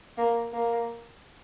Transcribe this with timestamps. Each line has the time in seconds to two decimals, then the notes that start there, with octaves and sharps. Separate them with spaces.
0.18 A#3
0.53 A#3